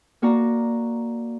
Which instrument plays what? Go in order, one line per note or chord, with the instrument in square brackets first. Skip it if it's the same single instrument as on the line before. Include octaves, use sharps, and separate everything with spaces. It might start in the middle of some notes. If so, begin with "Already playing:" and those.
[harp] A#3 F#4 D5 A#5